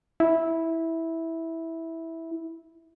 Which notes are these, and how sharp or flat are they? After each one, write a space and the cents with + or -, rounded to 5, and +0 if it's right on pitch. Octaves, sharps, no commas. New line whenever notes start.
E4 -10